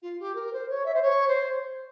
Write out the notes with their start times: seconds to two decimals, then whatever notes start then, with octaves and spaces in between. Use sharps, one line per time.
0.02 F4
0.19 G4
0.35 A#4
0.52 C5
0.69 C#5
0.85 E5
0.94 C5
1.02 C#5
1.28 C5